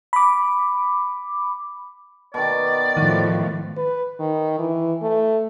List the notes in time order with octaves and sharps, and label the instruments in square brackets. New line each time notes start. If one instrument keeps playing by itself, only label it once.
[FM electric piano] B5 D6
[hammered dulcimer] B2 D#3 [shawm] D5
[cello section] A2 F3 [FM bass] D#3 [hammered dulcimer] F#4
[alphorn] B4
D#3
E3
A3